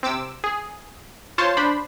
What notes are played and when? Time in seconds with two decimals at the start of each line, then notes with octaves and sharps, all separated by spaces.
0.03 C3 D6 E6
0.44 G#4
1.38 F4 C5 C#5 A5
1.57 D4 C5 B5